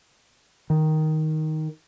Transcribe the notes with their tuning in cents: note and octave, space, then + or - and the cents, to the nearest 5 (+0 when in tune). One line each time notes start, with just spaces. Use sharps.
D#3 +5